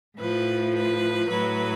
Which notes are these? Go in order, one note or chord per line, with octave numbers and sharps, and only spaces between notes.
A2 F3 B4
B4
A2 F#3 B4